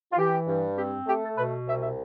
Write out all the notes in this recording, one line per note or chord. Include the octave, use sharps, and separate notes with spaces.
F4
E3 G4
G2
C4 G4
A3 G4
A4
B2 B4
C2 E5
E5